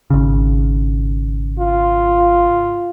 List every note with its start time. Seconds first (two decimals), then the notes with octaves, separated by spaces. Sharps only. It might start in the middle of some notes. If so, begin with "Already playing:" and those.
0.10 G#1 C#3
1.59 F4